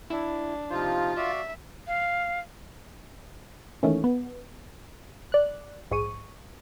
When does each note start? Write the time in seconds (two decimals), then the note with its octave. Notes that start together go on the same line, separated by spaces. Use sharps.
0.10 D4 E4
0.70 C3 F3 D#4 F4 C5
1.17 F#4 D5 E5 F5
1.87 F5
3.83 D#3 E3 A3 A#3 C#4
4.04 B3
5.32 D5 F#6
5.91 A#1 G#2 G#4 C#6 D#7